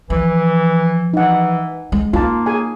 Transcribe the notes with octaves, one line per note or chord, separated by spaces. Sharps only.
E3 F3
E3 D#4 F#5
G#3
A#3 D#4 F4 A5
G#4 G#5